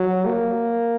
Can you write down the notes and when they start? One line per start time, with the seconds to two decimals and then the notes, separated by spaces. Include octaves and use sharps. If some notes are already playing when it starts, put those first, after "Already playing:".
Already playing: F#3
0.26 A#3